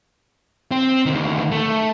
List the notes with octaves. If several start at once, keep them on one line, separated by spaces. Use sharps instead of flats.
C4
D2 D#3
A3